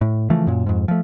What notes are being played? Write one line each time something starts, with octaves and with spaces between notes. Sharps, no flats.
A2
C#3 E3 F3 A3
F#2 A#2
F2 G#2
F3 A3